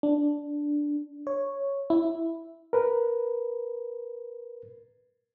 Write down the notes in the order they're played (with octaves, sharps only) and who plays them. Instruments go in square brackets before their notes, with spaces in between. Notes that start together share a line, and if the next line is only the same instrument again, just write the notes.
[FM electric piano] D4
C#5
E4
[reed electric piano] A#4 B4